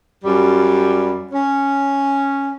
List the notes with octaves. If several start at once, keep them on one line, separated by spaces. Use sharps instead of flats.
F#2 G3
C#4